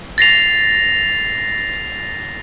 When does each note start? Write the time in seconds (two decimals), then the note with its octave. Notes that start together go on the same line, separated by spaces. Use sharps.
0.18 A6 A#6 C7 F7